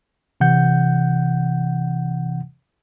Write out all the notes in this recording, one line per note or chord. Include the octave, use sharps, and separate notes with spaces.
C3 E3 F#5 G6